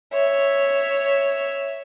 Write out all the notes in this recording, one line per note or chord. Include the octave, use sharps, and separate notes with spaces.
C#5 E5